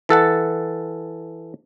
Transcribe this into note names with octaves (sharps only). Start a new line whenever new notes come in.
E3 A4 F#5 A5